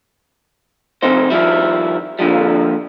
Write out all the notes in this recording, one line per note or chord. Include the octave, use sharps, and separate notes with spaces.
F2 C3 D#4 C5
D#3 F3 G3 E4
A#2 D3 F3 G3